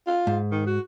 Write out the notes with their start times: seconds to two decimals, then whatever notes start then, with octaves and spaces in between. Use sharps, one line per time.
0.07 F4
0.27 G#2
0.52 D#3
0.67 F#4